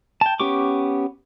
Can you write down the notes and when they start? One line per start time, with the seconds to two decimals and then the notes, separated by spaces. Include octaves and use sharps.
0.21 G5 A5
0.40 B3 C#4 G4 C#6 D6